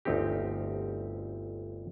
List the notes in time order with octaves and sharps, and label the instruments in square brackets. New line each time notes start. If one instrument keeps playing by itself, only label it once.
[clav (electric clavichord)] G1 D2 C4 D#4 G4